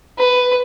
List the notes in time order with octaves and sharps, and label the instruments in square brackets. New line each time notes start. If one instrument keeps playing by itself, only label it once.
[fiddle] B4